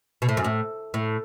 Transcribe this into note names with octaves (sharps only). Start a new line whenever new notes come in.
B2
A2
F#2
A2
A2